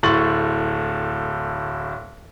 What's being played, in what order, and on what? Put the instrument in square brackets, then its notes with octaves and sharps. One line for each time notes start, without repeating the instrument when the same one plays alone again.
[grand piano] D1 A2 C6 C#6 A6 F#7